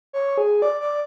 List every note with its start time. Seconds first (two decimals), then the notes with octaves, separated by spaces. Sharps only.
0.13 C#5
0.38 G#4
0.62 D5
0.81 D5